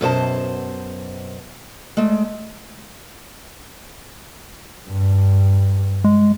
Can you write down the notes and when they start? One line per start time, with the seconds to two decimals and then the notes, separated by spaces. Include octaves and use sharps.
0.01 F#2 B2 C5 A5
1.97 G#3 A3
4.88 G2
6.04 G#3